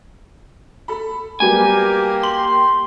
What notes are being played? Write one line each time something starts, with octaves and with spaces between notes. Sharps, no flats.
A4 B5
F#3 G3 A#3 B3 G4 G#5
C6 F#7